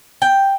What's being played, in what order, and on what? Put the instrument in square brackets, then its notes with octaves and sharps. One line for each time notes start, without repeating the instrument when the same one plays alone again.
[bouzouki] G5